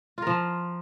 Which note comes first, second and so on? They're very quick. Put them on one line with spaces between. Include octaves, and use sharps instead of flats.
F4 A#4 F3